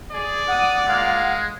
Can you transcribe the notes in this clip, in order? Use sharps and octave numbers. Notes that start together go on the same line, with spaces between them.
G#4 D5
F#5 D#6
G#3 A#3 F4 F5